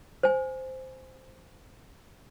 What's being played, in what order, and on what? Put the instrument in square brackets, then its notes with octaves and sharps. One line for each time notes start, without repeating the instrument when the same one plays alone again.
[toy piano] C5 G#5